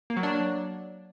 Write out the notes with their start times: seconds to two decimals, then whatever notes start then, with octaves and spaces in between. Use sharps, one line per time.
0.10 A#3
0.17 F#3
0.23 D4
0.30 F#3